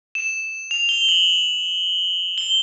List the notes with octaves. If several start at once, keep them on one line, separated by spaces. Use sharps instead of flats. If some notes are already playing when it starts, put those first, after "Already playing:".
E7
F7
G7
F#7
G7